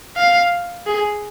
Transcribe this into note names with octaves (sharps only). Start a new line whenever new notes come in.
F5
G#4